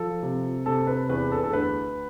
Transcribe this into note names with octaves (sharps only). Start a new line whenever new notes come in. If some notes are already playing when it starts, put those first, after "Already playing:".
Already playing: F3 A4
C3
C3 A4
B4
E2 B4
A4
A4
D2 B4